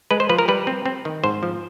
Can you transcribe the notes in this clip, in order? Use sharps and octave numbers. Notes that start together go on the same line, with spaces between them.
G#3 B4
C5
F3 B4
A#4
G3 B4
C4
C4
D#3
G#2 C5
F3